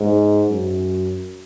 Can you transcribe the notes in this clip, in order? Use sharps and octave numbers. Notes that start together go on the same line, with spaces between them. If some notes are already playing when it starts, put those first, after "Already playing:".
Already playing: G#2
F#2